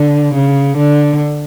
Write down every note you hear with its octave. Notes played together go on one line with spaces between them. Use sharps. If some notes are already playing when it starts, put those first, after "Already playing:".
Already playing: D3
C#3
D3